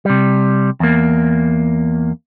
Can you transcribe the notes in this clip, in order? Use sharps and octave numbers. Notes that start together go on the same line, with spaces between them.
C3 G3
E2 A#3